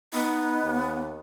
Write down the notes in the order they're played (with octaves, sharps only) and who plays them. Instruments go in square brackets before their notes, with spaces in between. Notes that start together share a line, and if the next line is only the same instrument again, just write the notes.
[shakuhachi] B3 [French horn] D#4
[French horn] D#2